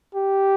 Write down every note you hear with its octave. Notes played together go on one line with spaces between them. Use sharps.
G4